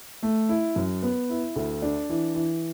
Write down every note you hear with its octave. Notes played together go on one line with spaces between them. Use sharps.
A3
E4
F#2
B3
E4
D2
D4
E3
E3